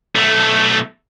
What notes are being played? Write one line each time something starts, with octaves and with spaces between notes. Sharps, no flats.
B1 A3